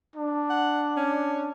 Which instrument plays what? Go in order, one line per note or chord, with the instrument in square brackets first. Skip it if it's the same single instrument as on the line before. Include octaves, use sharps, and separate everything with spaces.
[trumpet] D4
[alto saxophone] F#5
C#4